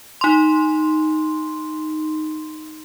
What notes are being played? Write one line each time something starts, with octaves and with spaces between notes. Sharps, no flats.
D#4 C6